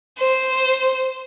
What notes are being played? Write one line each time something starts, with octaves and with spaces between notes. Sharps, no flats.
C5